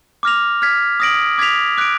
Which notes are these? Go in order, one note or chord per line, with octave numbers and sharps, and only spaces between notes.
D6 F6 A#6 F7
F6 G#6 B6
D#6 A#6 D7 F#7
D6 G#6 B6 F7
D6 F#6 D7